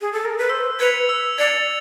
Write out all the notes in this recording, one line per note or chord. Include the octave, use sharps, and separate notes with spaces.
G#4
A4
A#4
B4
C5 E6
B4 G#6 C#7 F7
E6
D5 G#6 C#7 F7